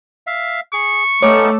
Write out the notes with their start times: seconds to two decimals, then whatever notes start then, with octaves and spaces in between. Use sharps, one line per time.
0.27 E5 F5
0.73 G#4 C#6
1.22 A3 B3 C#4 D#4 A4 C#5 D6